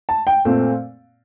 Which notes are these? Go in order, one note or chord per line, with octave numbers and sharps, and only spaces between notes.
A5
G5
A#2 A3 C4